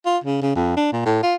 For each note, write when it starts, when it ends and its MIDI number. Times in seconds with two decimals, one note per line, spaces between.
0.06 0.18 65
0.24 0.41 49
0.42 0.54 49
0.56 0.73 41
0.77 0.90 62
0.93 1.05 46
1.06 1.19 45
1.23 1.35 65